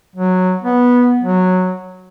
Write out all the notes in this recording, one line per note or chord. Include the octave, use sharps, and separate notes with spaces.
F#3
B3
F#3